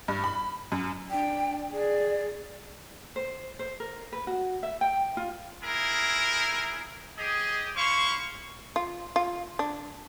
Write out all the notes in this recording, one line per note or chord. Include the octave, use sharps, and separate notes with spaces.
G2
B5
F#2
D4 G5
G#4 D5
C5
C5
A#4
B4
F#4
E5
G5
F4
D#4 E4 G#4 A#4
G4 G#4 D#5
E4 C5 F5 C#6
F4
F4
D4